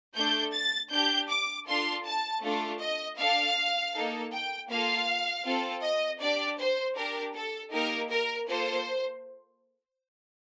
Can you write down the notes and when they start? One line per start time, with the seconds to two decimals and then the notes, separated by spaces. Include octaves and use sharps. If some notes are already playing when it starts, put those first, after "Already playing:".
0.15 A3 D4 A4 G6
0.53 A6
0.91 D4 G4 G6
1.29 D6
1.66 D4 F4 A4 C6
2.05 A5
2.42 A3 D4 F4 A4
2.80 D#5
3.18 D4 A4 F5
3.94 A#3 D#4 A4
4.32 G5
4.69 A#3 F4 A4 F5
5.44 C4 F4 A4
5.83 D#5
6.21 D4 G4 D5
6.59 C5
6.96 D4 G4 A#4
7.34 A4
7.72 A#3 D#4 G4 A#4
8.10 A#4
8.48 A#3 F4 A4 C5